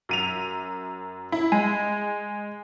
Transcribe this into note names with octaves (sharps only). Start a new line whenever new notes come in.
F#2 D#7 F7
E4
G#3 G#5